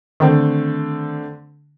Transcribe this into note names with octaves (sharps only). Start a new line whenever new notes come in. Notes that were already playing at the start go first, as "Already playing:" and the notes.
D3 D#3 A3 C4